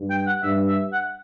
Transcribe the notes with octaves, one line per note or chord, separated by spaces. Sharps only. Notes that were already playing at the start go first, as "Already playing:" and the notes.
Already playing: G2
G5
F#5
G2 E5
E5
F#5